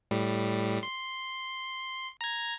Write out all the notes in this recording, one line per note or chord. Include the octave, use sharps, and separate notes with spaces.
A2 G3
C6
A#5 G#6